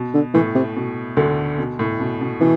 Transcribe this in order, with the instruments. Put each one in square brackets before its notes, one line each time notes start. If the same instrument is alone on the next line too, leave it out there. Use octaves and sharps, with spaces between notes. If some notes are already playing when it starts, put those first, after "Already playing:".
Already playing: [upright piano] B2
[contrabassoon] D3
[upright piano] A2 [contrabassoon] E3
[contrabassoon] C3
[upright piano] B2
D2 D3
B2
A2
B2
B2
[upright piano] B2 [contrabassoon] E3